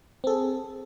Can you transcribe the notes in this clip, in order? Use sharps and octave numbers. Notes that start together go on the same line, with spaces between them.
C4 G#4 A4